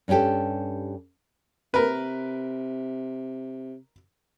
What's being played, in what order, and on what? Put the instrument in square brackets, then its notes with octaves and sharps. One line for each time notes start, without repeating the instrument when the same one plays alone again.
[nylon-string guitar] G2 C#4 E4 G4 A4
[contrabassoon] C3 [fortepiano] A#4 B4